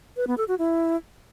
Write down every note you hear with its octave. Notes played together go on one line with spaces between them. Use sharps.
B4
B3
A4
F#4
E4